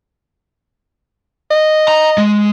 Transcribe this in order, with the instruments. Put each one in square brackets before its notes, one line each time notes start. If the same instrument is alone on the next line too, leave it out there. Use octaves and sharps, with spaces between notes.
[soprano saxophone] D#5
[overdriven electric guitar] A#5
G#3